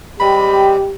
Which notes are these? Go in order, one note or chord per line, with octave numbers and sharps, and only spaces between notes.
G3 G#3 C4 G4 B5